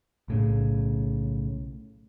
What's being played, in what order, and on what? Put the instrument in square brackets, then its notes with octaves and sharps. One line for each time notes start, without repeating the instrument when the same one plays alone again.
[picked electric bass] B1 A2 C#3